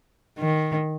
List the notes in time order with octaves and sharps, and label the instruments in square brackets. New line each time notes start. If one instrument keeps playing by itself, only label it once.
[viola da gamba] D#3